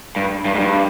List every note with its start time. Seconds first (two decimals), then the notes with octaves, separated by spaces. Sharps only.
0.16 G2
0.45 G2
0.55 G#2
0.60 G2